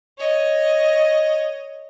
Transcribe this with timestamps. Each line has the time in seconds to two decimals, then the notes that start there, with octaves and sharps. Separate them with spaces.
0.18 C#5 D#5